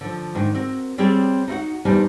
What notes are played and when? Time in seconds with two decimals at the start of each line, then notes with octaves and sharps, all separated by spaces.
0.01 D3 F3
0.35 G#2 D#3 D4
0.54 C4 F#4 A#4
0.98 G3 C4 F#4 G#4 C#5 D5
1.48 D#4 E4 F#4 F#5
1.85 E2 G3 D4 D#4 C5 G#5